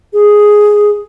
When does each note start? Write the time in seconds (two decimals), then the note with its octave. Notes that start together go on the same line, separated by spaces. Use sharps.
0.13 G#4